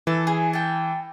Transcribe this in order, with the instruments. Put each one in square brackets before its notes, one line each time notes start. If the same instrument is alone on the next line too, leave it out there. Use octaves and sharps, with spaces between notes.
[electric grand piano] E3 [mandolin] A4
[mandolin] G#4
G5 A5